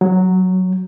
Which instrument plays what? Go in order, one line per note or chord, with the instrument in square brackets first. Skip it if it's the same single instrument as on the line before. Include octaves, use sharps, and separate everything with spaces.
[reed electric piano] F#3